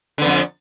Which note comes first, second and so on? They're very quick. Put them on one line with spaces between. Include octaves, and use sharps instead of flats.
D3 B3 F2